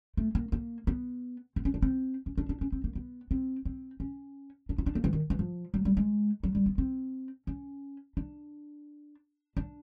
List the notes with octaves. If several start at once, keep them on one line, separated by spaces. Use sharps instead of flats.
A3
A#3
A#3
B3
C4
C#4
D4
C4
C#4
D4
D4
C#4
C4
A#3
B3
C4
C4
C#4
D4
D#4
D4
A#3
E3
D#3
E3
F3
F#3
G3
G#3
F#3
G3
B3
C4
C#4
D4
D4